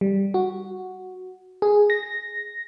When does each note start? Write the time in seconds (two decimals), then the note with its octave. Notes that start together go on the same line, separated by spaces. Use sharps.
0.01 G3
0.34 F#4
1.62 G#4
1.90 A#6